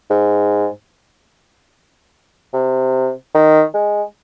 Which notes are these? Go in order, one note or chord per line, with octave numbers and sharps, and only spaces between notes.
G#2
C3
D#3
G#3